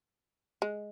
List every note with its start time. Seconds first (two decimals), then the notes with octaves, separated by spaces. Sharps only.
0.62 G#3